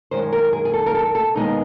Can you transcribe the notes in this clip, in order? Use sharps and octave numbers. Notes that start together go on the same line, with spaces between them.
F#2 D#3 G#3 C5
A#4
G#4
G#4
A4
A#4
A4
A4
D#2 D#3 G#3 B3 D#4